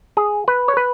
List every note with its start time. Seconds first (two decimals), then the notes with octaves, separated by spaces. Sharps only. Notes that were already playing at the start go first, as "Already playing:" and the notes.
0.17 G#4
0.48 B4
0.68 C#5
0.77 B4